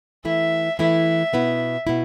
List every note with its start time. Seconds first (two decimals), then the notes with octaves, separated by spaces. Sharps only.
0.25 E3 A3 E4 E5
0.79 E3 A3 E4 E5
1.33 B2 B3 E4
1.87 B2 B3 E4